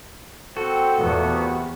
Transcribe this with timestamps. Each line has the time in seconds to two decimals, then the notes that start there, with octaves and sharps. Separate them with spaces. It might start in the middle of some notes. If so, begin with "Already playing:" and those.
0.57 C4 F#4 A4
0.99 E2 A#2 A3 B3
1.30 C3